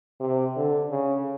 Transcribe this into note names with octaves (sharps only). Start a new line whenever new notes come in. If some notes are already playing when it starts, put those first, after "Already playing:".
C3
D3
C#3